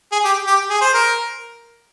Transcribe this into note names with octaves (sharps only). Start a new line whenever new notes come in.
G#4
G4
G4
G#4
C5
A#4